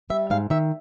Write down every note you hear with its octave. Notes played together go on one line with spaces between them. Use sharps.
G3 E5
G#2 F5
D#3 E5